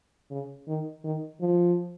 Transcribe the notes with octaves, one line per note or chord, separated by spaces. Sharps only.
C#3
D#3
D#3
F3